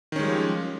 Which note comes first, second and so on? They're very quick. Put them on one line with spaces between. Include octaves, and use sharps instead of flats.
D#3 C#4 G#3 G3 F3